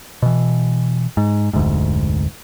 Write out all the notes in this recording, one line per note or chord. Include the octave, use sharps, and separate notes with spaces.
B2 E3
G#2
F1 D2 G#2